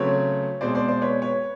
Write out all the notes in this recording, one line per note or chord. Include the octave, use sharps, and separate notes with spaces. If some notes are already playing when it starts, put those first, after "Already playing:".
Already playing: C#3 F#3 A3 C4 B4 C#5
B2 G#3 C4 C5 D5
C5 D5
C5 D5
B4 C#5
B4 C#5